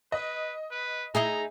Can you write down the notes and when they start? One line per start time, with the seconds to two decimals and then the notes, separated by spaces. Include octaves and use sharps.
0.12 B4 D#5
0.71 B4
1.15 D#4 E4 G#4 A#5